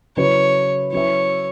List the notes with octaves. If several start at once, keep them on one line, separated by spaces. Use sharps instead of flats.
C#3 F#3 E4 B4 C#5
F#3 C#4 E4 B4 C#5 E5